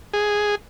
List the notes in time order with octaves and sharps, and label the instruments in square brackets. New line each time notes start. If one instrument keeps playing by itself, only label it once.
[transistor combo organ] G#4